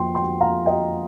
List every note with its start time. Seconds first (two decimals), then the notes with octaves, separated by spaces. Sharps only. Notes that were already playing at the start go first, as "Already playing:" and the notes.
Already playing: F2 F3 A#3 G5 C6
0.15 G5 C6
0.40 F5 A#5
0.66 D#5 G5